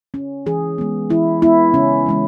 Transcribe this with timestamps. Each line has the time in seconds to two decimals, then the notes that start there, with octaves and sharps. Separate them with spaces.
0.14 C#4
0.46 E3 G#4
0.78 G#3 B3
1.10 E3 E4
1.42 G#3 B3 E4
1.74 C#3 C#4
2.06 E3 G#3 C#4